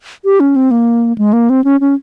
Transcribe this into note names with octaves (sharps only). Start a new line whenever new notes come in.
G4
C#4
C4
A#3
G#3
A#3
C4
C#4
C#4